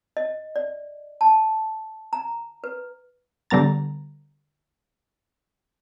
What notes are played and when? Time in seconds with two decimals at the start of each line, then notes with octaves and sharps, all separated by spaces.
0.17 D#5
0.56 D5
1.21 A5
2.13 A#5
2.64 B4
3.50 D3 G3 B3 A#5 A6